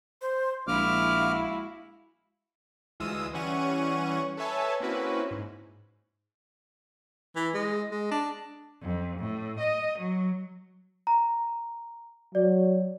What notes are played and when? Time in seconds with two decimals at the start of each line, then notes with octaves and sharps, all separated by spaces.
0.21 C5
0.67 A#1 G#3 E4 F#4 F5 D6 F6
3.00 D2 E3 G#3 F4 D#6 E6
3.33 E3 G3 C#4 F#5 C#6 D#7
4.37 A4 B4 C#5 E5 G#5 A5
4.80 A#3 C4 C#4 E4 F#4 B4
5.31 G#2
7.36 E3
7.54 G#3
7.91 G#3
8.11 D4
8.82 F2
9.19 A2
9.59 D#5
9.98 F#3
11.07 A#5
12.35 F#3 D5